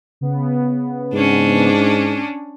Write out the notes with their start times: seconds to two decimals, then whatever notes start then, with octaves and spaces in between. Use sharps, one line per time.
0.21 C#3 B3
1.13 G#2 C#4 D4